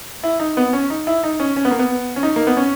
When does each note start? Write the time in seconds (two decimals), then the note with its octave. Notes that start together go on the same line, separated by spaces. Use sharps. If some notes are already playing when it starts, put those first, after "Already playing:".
0.23 E4
0.40 D#4
0.57 B3
0.73 C#4
0.90 D#4
1.07 E4
1.24 D#4
1.40 C#4
1.57 C#4
1.65 B3
1.71 A#3
1.79 B3
2.16 C#4
2.23 D#4
2.36 A#3
2.47 B3
2.57 C#4